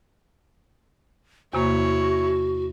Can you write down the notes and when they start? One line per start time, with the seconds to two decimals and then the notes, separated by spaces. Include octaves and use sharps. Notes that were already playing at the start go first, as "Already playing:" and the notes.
1.53 E2 C3 A#3 E4 F#4 C#5